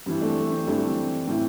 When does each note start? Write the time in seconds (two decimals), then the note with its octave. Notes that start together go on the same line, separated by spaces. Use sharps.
0.06 G2 E3 C4
0.21 A3 D4
0.37 A3
0.51 C4
0.67 G2 E3 A3 D4
0.88 C4
1.27 A2 E3 C4